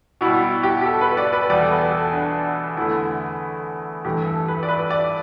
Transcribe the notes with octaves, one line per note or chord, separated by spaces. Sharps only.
B2 G3 E4
E4
G4
G4
A4
B4
D5
B4
E2 B2 G3 D5
A4
B4
A4
D4
E2 D3 A3 E4
G2 E3 A3 G4
A4
B4
D5
B4
D5